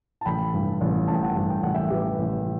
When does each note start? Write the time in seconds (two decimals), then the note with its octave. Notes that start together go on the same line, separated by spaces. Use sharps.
0.21 A5
0.25 A1 G5 B5
0.54 G2
0.81 A1
1.08 A1 A5
1.15 G5
1.23 F#5 A5
1.36 G2
1.50 G5
1.63 A1 F#5
1.74 E5 G5
1.90 A1 G4 B4
2.19 A1